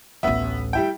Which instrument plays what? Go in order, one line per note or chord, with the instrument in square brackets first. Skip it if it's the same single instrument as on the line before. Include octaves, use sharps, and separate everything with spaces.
[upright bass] A1 D2 [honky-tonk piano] B3 E5
[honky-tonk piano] G3 E4 G5